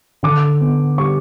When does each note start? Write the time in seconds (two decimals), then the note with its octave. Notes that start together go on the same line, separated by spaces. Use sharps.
0.23 D3 D6
0.61 B3
0.98 G3 C#6